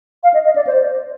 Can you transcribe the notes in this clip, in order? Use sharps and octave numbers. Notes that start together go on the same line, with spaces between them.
F5
D#5
D#5
D5
C5